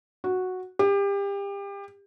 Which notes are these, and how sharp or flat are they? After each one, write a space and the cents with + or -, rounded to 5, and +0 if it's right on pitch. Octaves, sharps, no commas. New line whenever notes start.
F#4 -5
G4 +30